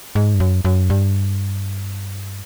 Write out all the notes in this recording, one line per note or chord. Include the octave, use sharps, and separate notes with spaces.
G#2
G2
F#2
F#2
G2